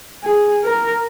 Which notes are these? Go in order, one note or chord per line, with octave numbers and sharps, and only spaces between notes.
G#4
A#4